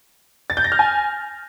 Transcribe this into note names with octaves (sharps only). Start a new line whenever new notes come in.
A6
G6
A#6
F6
G#5